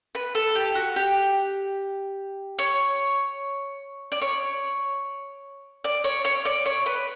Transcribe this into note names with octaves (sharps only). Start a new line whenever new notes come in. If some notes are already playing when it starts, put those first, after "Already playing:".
B4
A4
G4
F#4
G4
C#5
D5
C#5
D5
C#5
C#5
D5
C#5
B4